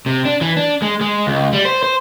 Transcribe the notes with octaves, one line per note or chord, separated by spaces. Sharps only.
C3
D4
E3
D4
G#3
G#3
C#2
G3
C5
C5